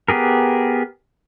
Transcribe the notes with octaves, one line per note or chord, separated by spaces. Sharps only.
B3 G4 G#4 A#4